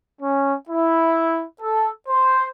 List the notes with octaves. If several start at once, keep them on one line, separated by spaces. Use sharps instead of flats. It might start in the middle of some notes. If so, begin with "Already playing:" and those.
C#4
E4
A4
C5